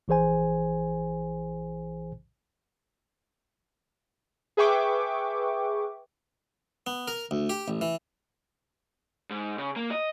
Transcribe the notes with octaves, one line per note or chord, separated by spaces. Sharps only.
A#1 E3 G#4 C5 G#5
G#4 B4 E5 G5 C#6 D6
B3
A#4
D2
G4
A1
E3
G#2
C#3
A#3
D#5